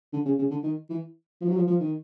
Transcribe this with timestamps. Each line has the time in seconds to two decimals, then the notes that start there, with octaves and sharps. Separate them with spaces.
0.13 D3
0.25 C#3
0.39 C#3
0.51 D3
0.63 D#3
0.90 E3
1.41 F3
1.49 F#3
1.56 F3
1.67 F3
1.80 D#3